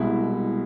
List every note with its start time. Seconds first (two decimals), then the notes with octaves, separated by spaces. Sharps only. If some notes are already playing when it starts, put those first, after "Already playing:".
Already playing: C2 B2 G#3 E4